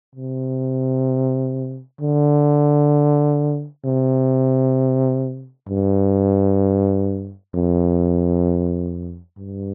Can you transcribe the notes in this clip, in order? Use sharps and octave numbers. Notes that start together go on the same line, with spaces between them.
C3
D3
C3
G2
F2
G2